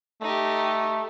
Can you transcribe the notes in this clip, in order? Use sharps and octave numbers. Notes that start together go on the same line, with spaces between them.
A3 D#4 G4